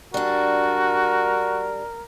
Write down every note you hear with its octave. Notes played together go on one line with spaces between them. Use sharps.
G3 D4 F#4 A#4